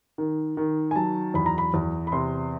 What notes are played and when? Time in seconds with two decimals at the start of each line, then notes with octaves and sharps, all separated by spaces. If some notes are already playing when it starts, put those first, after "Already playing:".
0.18 D#3
0.57 D#3
0.91 G#5
0.96 F#3 A5
1.34 E2 B5
1.46 A#5
1.58 B5
1.74 E2
2.07 B5
2.12 C3 C6